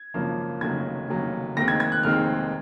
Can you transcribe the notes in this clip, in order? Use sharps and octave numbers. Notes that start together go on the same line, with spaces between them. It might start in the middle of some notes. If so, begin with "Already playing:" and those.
Already playing: G#6
G#1 F#2 C#3 F3 A#3
F1 D#2 C#3 F#3 G#6
F1 D#2 C#3 F#3
F1 D#2 D#3 G#3 C4 A#6
G#6
G#6
F#6
F1 D#2 D#3 G#3 C4 F6